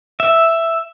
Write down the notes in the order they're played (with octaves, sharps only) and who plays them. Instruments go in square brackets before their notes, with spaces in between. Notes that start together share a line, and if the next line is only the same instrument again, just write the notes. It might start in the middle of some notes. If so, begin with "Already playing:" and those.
[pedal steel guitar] E5